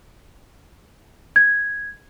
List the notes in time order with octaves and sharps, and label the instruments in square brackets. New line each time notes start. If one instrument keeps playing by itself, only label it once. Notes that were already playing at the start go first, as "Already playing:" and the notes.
[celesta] G#6